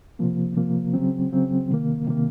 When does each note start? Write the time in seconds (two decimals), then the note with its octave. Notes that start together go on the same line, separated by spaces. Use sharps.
0.19 C3 F3 A#3
0.56 C3 F3 A#3
0.94 C#3 F#3 C4
1.32 C#3 F#3 C4
1.70 C3 D#3 A#3
2.07 C3 D#3 A#3